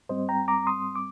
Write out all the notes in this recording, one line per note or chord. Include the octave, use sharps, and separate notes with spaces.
G#2 G3 C4 C5 D#5
G5 A#5
A#5 D6
C6 D#6
D6